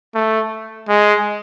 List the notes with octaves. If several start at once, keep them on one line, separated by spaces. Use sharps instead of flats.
A3
G#3